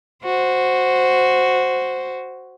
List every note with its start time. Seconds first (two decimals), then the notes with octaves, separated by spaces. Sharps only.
0.24 F#4 C5